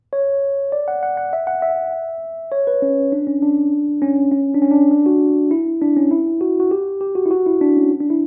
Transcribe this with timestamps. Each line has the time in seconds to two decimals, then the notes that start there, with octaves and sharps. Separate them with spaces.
0.13 C#5
0.72 D5
0.88 F#5
1.03 F#5
1.17 F#5
1.33 E5
1.47 F#5
1.62 E5
2.52 C#5
2.67 B4
2.82 C#4
3.12 D4
3.27 C#4
3.42 D4
4.02 C#4
4.31 C#4
4.54 D4
4.62 C#4
4.71 D4
4.91 D4
5.06 F#4
5.51 E4
5.82 D4
5.96 C#4
6.11 E4
6.41 F#4
6.60 F#4
6.71 G4
7.01 G4
7.15 F#4
7.26 E4
7.31 F#4
7.46 E4
7.61 D4
7.76 C#4
8.00 D4
8.10 E4